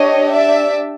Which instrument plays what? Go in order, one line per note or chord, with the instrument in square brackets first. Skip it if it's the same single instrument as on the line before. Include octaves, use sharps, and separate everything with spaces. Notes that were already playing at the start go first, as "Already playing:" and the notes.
Already playing: [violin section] D4 G4 C#5 D#5
D5 E5